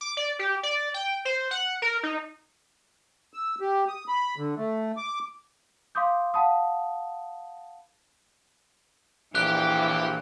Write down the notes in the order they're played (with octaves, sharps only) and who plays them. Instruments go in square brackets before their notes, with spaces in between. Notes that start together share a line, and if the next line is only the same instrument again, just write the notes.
[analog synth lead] D6
D5
G4
D5
G5
C5
F#5
A#4
D#4
[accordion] E6
G4
D#6
B5
D3
A3
D6
[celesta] F5 C6 D6 D#6 G6
F5 F#5 A5 B5 D#6
[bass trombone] A#1 [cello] E3 [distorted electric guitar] G4 G5 [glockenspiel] F#6